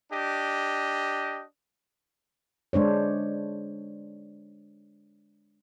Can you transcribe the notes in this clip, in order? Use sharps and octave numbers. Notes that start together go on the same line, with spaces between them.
D4 G4 D#5
G#3 D4 C5 C#5